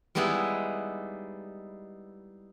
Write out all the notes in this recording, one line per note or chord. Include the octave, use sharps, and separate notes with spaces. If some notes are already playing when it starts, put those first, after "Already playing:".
G3 G#3 B3 D#4 E4 G#4